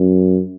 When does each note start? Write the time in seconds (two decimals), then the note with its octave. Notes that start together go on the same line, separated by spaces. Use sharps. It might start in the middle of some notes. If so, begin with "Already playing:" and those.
Already playing: F#2